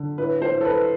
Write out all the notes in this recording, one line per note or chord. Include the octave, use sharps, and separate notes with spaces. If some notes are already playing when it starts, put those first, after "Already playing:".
Already playing: D3
A2 B4
C5
A2
A4
B4